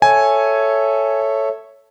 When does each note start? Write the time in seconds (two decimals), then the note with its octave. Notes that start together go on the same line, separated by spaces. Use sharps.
0.02 A4 C#5 E5 G#5